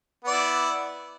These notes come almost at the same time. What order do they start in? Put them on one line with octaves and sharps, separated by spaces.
B3 D5 E4